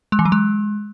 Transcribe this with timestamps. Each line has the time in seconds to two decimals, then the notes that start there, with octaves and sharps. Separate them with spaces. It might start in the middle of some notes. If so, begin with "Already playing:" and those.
0.12 G#3
0.19 E3
0.25 F#3
0.32 G#3